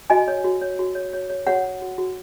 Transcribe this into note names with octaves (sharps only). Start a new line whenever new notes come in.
F#4 D#5 G#5
C#5
F#4
C#5
F#4
C#5
C#5
C#5
F#4 C#5 F#5
C#5
F#4
F#4